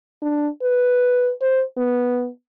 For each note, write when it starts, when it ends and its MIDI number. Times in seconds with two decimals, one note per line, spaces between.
0.22 0.48 62
0.62 1.31 71
1.42 1.63 72
1.77 2.29 59